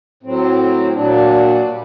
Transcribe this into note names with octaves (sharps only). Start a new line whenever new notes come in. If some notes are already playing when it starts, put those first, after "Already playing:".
A2 F#3 C4
A#2 F#3 D4
A#2 G3